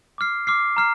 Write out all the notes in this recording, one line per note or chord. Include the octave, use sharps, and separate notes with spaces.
D6 F6 C7
D6 F6 C7
A#5 F6 C7